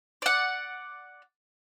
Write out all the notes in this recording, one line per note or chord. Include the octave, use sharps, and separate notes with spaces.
D5 F#5